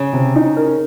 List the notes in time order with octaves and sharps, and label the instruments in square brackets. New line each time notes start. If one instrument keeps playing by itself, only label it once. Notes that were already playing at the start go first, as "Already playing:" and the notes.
Already playing: [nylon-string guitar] C#3
[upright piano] C3
D#4
A#4